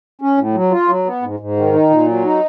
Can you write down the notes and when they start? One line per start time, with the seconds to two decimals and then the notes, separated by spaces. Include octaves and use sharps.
0.21 C#4
0.38 A2
0.54 F#3
0.71 F4
0.88 F#3
1.05 B3
1.22 G#2
1.40 G#2
1.57 D#3
1.73 D#4
1.90 A#2
2.07 F#3
2.24 D#4